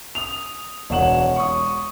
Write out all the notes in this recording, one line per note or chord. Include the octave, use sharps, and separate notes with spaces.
D#6 F7
E1 C#5 F#5 E7 F#7
C#6 D#6